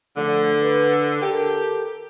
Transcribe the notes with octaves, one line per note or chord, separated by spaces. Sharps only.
D3 F3 A3
B4
G4 A4 A#4